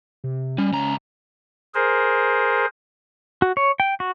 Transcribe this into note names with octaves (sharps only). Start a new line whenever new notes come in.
C3
G3 C#4
C#2 A#5
G#4 A#4 C5
F#4
C#5
G5
F#4